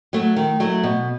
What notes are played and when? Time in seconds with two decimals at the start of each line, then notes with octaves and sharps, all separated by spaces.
0.13 F#3 A3
0.36 D#3
0.60 F#3 A3
0.83 B2